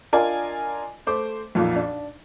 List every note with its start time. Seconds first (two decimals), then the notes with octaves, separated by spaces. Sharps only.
0.13 D4 F4 A#4 D5 D#5 G#5
1.07 A3 C5 D6
1.55 B1 F2 A#2
1.76 D4